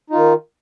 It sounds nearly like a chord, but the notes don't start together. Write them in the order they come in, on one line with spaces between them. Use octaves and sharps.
D#4 F4 D#3